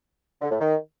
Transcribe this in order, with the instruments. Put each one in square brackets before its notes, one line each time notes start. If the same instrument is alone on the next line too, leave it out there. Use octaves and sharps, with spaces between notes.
[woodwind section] D3
A2
D#3